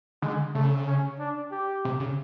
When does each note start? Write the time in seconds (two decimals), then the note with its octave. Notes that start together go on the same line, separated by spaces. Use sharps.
0.22 D3 G#3
0.55 C#3 A3
0.87 C#4
1.20 D4
1.52 G4
1.85 C3
2.00 C#3